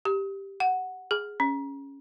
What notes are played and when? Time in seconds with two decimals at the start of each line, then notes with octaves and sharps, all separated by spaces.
0.05 G4
0.60 F#5
1.11 G#4
1.40 C#4